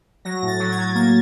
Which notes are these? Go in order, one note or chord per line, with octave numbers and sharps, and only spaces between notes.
F#3 A#6
A2
A6
F#3
G#6
F#3
A#3 A6